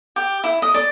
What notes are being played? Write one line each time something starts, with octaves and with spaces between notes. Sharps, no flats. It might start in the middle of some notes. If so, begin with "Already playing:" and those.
G4
E4
D#5
D5